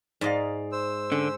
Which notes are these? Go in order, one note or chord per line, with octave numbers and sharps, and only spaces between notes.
G#2 D5 D#5 F5
C5 E6
D3 C#4